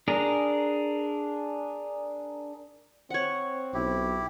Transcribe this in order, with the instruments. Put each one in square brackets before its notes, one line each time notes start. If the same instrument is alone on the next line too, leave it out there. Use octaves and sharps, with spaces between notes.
[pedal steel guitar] D4 G#4 A#4
[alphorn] C4 [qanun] C#5 F#5
[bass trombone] B1 [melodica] E4 G4